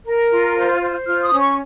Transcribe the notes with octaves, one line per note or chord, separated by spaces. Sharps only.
A#4
F4
C5
C5
F4 F6
D#6
C#4
C#6